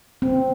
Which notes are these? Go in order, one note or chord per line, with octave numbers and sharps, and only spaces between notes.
C4